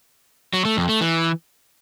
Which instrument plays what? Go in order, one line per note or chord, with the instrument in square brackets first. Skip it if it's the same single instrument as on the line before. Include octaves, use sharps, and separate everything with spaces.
[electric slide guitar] F#3
A3
F2
A3
E3